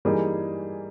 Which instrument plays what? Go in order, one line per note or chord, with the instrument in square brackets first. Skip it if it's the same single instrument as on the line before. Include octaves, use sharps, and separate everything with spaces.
[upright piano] E3 G3 A#3 D#4 G#4